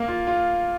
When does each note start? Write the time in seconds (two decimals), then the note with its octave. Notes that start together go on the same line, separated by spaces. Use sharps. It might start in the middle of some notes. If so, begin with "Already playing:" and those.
Already playing: A#3
0.08 F4
0.27 F4